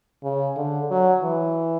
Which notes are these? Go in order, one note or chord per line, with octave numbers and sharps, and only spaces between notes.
C#3
D3
F#3
E3